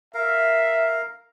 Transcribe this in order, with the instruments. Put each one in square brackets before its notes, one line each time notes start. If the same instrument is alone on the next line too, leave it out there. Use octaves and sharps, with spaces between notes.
[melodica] A#4 F5 [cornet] E5